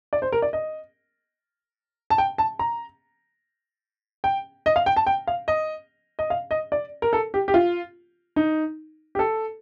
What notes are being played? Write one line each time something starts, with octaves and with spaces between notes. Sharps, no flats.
D5
C5
A#4
D5
D#5
A5
G5
A5
A#5
G5
D#5
F5
G5
A5
G5
F5
D#5
D#5
F5
D#5
D5
A#4
A4
G4
G4
F4
D#4
G4
A4